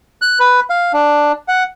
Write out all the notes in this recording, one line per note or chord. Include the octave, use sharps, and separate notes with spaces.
F#6
B4
F5
D4
F#5